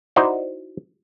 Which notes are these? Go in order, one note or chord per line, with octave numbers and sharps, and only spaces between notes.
D#4 E4 F#4 C5 D5